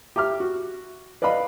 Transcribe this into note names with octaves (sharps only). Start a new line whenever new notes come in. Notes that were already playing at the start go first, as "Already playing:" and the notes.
G4 E5 D6 F6
F#4
B4 D5 D#5 F5 B5